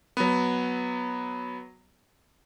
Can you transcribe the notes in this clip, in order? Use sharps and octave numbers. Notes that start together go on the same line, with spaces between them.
F#3 B3